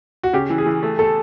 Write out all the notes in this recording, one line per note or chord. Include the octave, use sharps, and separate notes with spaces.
F#4
C#3 G4
E3
G#4
E3
A3
A3 A4